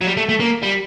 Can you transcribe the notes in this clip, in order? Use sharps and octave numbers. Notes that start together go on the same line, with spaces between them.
F#3
G3
A3
A3
A#3
G3